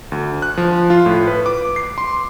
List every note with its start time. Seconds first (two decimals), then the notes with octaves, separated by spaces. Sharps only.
0.12 D2
0.42 F#6
0.57 F3
0.90 F4
1.06 A2
1.27 B4
1.46 D6
1.76 C7
1.98 C6